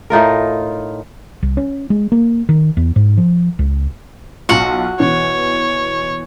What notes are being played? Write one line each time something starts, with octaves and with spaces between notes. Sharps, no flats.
A2 D#4 F4 A#4
C2
C#4
G#3
A#3
D#3
E2
G#2
F3
C#2
B1 F4 F#4 F#5
B2 E3 C#5